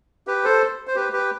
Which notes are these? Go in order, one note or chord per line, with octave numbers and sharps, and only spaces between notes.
G4 B4
A4 C5
C5
G4 B4
G4 B4